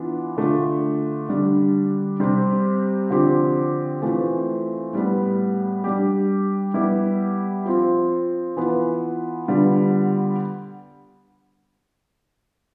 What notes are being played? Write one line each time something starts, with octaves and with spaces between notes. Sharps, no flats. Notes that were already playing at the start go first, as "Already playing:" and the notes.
Already playing: E3 B3 D4 F4
D3 A3 D4 F4
D3 G3 D4
C3 G3 C4 G4
D3 F3 C4 G4
E3 A3 C4 F4
A2 G3 B3
G3 D4 G4
G3 B3 E4 G4
F3 C4 F4
E3 B3 F4
D3 G3 B3 F4